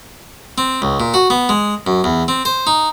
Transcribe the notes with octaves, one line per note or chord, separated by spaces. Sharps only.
C4
C#2
A#2
F#4
B3
G#3
F#2
E2
C4
C5
D#4